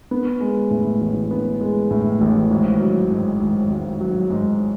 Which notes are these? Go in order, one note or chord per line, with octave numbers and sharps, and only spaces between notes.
B3
G#3
A2
A1
B3
G#3
A2
A1
G#1
F#3
G#2
G#1
G#1
F#3
G#2